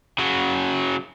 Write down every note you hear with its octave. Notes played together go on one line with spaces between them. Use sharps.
C#3 F#3